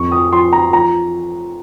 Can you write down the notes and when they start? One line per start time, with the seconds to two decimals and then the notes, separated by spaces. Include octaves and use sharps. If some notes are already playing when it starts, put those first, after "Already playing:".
Already playing: F2 C#6
0.12 D#6
0.32 F3 C6
0.52 A#5
0.73 F3 A#5